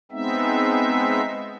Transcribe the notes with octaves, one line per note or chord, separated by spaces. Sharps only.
G#3 B3 C4 D#4 E5